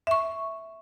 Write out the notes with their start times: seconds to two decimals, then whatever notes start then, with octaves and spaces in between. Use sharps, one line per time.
0.07 E5 C#6